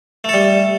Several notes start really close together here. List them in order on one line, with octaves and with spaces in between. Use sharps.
A3 A4 G3